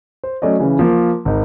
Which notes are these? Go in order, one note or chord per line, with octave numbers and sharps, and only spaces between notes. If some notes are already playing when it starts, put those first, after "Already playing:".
C5
F#3 A3 C#4 D5 D#5
C#3 E3
F3 A#3
G#1 D#4